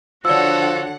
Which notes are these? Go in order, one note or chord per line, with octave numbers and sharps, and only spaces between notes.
D3 F3 F#4 A4 C#5 D5 F#5 E6